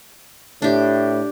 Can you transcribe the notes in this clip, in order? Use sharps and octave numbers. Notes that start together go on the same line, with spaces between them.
A2 D4 G4